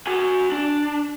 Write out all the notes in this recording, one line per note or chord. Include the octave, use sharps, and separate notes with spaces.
F#4 G#5
D4